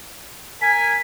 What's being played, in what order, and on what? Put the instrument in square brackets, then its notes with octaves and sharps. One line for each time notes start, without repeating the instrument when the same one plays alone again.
[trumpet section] A#4 G#5 [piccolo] B6